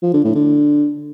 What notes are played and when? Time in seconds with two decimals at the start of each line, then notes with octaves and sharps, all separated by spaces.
0.03 F3
0.14 D3
0.24 A2
0.35 D3